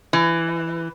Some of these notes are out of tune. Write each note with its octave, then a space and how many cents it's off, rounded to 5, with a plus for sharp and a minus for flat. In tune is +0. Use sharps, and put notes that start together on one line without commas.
E3 +15